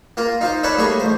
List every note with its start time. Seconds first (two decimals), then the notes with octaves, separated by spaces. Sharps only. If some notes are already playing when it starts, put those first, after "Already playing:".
0.17 A#3 F4 A#4
0.41 D#4 F4 C5
0.63 D#4 A4 B4 C#5 D5 G#5
0.78 A2 G3 A#3 G#4 B5 C#6
1.00 A1 C5